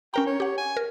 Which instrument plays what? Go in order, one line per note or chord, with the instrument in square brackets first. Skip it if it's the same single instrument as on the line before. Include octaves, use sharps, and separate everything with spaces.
[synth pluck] C#4 A#4 A#5 [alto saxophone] G5
[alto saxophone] C#5
[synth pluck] G4 F#5
[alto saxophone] G#5
[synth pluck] A#4